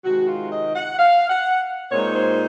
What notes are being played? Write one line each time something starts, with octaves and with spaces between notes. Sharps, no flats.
C3 D#3 G#3 F#4
F4
D#5
F#5
F5
F#5
A#2 G#3 C4 D#4 C#5
C5